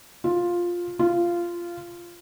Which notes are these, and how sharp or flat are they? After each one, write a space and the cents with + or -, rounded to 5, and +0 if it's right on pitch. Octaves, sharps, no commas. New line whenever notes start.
F4 +5
F4 -15